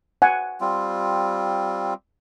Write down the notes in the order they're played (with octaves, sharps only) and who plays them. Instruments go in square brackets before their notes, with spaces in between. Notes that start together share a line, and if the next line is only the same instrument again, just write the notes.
[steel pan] F#5 G#5
[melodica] G3 C4 F4